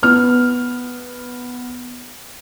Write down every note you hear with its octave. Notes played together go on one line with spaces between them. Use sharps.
B3 F6